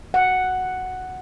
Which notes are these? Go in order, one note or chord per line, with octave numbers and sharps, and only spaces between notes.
F#5